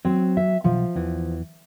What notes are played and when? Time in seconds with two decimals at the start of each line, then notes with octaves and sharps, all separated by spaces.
0.05 F#3 C4
0.37 E5
0.64 B1 F3
0.95 E2 E3